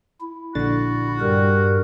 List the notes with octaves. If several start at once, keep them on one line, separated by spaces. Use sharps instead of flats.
E4
A#1 D3 F#4 A6
G2 G3 A#4